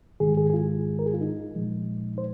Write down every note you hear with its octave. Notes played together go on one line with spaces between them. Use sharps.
G#2 D#3 G#3 G#4
G#4
G#4
F4
A#4
G#4
F4
D#4
A#2 F3 G#3
C5